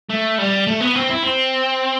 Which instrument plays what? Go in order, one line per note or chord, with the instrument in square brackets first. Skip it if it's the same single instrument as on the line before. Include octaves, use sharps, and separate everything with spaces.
[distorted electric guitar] A3
G3
A3
B3
C4
E4
C4